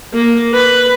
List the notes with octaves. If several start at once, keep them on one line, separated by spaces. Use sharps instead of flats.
A#3
B4